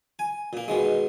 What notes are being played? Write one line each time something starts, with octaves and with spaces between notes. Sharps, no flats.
G#5
A#2 A#3
B2 D#3 G#3